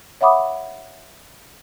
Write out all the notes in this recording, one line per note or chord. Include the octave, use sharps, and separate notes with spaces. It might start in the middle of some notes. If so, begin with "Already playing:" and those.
C#5 E5 F#5 B5 D6 D#6